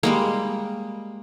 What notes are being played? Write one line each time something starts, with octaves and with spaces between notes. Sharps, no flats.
G3 G#3 A#3